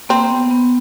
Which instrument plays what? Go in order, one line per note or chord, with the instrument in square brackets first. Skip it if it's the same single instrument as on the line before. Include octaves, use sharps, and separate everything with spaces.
[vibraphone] A#3 [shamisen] C4
[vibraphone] B3
B3